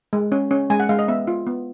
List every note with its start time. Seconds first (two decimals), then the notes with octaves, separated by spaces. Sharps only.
0.13 G#3
0.32 C#4
0.51 C#4
0.70 G#3 G#5
0.80 F#5
0.89 G#3 F5
0.99 D#5
1.08 B3 E5
1.27 F4
1.47 B3